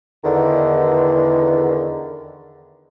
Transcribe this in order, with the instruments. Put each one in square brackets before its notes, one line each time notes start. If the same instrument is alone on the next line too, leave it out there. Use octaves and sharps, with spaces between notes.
[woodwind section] E2 D3 D#3